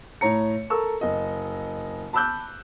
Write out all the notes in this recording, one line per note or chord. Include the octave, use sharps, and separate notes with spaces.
A2 C#5 A#5 C#7
A4 A#4 C#6 E6
F#1 D#5
A5 B5 D6 E6 F#6 G6